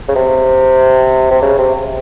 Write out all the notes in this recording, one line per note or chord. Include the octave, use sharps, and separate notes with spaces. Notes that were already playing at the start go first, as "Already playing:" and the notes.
C#3
C3
C3
C#3
C3